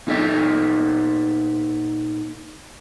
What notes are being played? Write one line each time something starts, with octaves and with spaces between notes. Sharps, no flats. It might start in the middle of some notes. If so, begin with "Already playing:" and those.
A#2 D#4 A4 E5 G5